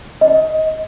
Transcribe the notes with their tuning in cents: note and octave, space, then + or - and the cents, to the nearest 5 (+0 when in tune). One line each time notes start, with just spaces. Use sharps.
D#5 +20